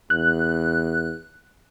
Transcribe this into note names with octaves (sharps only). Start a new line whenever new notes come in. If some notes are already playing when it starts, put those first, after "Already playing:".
E2 F#6